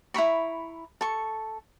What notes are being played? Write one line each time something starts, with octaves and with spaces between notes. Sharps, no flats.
E4 A#5 B5 C#6
A4 C#6